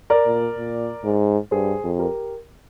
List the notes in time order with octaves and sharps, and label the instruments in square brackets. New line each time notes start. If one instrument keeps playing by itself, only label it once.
[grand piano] A#4 D5
[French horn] A#2
A#2
G#2
[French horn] G2 [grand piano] G#4 C5
[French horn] F2
[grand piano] G4 A#4